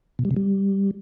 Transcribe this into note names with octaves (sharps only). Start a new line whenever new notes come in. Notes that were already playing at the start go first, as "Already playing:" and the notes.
B2
G3
C3
G3